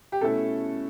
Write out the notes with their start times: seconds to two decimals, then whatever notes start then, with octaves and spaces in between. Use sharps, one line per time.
0.12 G4
0.21 B2 A3 C#4 E4 A4